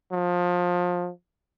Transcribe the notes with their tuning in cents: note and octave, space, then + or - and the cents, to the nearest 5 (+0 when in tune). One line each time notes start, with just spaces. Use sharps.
F3 +25